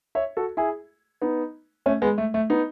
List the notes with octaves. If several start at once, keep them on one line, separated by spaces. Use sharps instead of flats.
C#5 E5
F#4 A4
E4 G#4
B3 D#4
A3 C#4
G#3 B3
A3
A3
B3 D#4